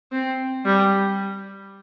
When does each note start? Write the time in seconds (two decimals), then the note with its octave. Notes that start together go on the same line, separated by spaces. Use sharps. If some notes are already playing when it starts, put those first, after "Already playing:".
0.12 C4
0.65 G3